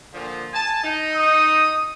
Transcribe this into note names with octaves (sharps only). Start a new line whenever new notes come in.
A#2 D3 F3
G#5 A5
D#4
D#6